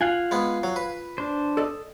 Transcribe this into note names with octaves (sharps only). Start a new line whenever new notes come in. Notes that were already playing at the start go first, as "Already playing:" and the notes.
F4 F5 F#5 G#5
G#3 B3
F#3
B4
D4 C5
A4 D5 D#5